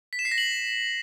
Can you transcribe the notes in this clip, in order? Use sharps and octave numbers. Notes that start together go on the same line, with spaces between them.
B6
E7
C7
A#6
F#7